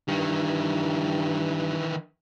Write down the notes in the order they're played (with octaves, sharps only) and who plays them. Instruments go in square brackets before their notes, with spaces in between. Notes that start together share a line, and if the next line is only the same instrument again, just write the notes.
[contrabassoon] G2 [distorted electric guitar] D#3 E3